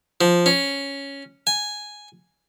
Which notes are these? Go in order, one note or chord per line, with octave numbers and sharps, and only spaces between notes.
F3
C#4
G#5